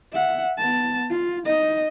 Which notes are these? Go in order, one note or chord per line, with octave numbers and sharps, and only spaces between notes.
E5 F#5
B3 A5
F4
D#4 D#5